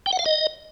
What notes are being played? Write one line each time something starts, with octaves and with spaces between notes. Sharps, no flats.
G5
F#5
F5
D#5